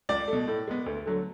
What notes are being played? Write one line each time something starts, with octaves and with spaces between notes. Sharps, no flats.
C#2 D5
A3
B2
A2
G#3 B3
D2
D3 F#3 A3